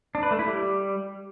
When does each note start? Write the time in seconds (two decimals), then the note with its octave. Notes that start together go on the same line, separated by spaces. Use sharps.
0.15 D4
0.23 B4
0.31 A3
0.39 E4
0.47 G3